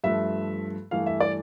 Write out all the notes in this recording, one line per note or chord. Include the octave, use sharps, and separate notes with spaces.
G2 F3 A3 E5
G2 E3 A3 F5
E5
D5